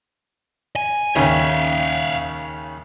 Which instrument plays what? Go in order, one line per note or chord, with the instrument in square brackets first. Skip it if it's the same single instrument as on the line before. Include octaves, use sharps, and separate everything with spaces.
[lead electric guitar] G#5
[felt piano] D#2 C#3 C#4 [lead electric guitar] E5 F5